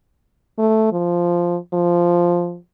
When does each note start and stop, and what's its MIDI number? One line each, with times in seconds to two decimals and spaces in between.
0.59 0.87 57
0.92 1.57 53
1.73 2.57 53